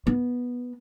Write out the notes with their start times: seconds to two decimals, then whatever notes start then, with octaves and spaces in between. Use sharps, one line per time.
0.07 B3